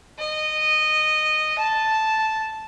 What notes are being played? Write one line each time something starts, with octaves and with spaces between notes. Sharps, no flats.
D#5
A5